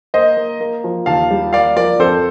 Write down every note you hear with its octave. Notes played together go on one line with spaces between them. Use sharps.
A#3 C5 D#5
A#3
A#3
F3
D#2 F5 A5
G3
A#3 D5 F5
F3 A#4 D5
F2 A4 C5